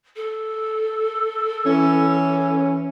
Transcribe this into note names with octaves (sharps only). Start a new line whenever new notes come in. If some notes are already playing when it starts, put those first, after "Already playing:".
A4
E3 C#4